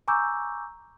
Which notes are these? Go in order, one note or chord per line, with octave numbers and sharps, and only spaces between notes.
G#5 A#5 C#6 D6 E6 G6